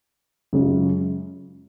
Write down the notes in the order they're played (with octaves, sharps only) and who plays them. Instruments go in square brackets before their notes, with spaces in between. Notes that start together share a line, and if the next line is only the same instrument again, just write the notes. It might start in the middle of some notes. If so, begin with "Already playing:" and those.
[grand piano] F#2 C#3 G#3 C#4 F4